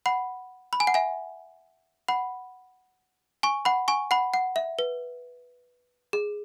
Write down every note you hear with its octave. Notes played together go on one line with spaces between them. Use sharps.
F#5 B5
B5
G#5
F#5
E5 G#5
F#5 B5
G#5 C#6
F#5 B5
G#5 C#6
F#5 B5
F#5
E5
B4
G#4